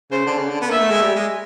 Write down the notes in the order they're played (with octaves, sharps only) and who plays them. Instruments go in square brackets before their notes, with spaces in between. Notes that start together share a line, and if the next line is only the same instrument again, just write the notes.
[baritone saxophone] C#3 [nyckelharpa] C5
[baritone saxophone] D3
C#3
D3
B3
[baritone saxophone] A#3 [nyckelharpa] E5
[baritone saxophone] A3
G#3
G3
G#3